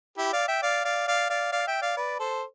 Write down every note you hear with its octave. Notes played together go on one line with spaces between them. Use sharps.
E4 G4
D5 F5
E5 G5
D5 F5
D5 F5
D5 F5
D5 F5
D5 F5
E5 G5
D5 F5
B4 D5
A4 C5